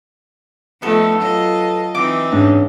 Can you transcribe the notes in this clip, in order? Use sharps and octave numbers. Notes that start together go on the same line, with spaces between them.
F3 A3 B3 D#4 A4
F#3 F4 D#5
E3 C4 D#4 D6
G#2 C#4 D4